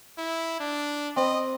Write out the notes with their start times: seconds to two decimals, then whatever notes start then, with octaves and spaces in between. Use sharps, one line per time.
0.18 E4
0.60 D4
1.16 C4 D#5 B5